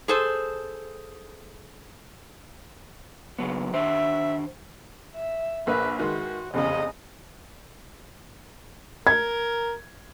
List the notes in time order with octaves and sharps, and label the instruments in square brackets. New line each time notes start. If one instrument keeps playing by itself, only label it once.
[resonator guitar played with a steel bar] G#4 A4 C5
[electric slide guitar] C#3 F#3 B3
[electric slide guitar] D#3 D4 C5 [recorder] E5
[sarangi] E5
[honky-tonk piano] A#1 A#3 E5 [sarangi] B4
[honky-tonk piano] D#3 G#3 [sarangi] F#4
[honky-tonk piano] F1 E2 C#3 [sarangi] D#5
[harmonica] A#4 [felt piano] G#6